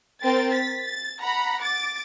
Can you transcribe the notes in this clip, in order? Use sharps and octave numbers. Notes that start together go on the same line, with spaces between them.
C4 A#4 G5 A6
A6 B6
A6
F#5 A#5 B5
D6 A6